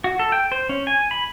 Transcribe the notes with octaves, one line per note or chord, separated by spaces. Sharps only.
F#4
A4
G5
C5
C#4
G#5
B5